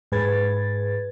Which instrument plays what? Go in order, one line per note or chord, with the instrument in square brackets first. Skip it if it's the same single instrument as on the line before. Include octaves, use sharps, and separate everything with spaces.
[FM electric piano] G#2 G#4 B4 G#6 A6